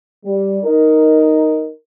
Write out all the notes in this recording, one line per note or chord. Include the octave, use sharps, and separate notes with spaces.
G3
D#4 A#4